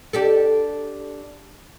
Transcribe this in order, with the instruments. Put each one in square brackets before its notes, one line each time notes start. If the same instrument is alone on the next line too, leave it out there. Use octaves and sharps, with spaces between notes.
[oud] D4 G4 A4